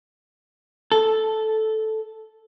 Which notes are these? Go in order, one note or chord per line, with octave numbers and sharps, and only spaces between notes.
A4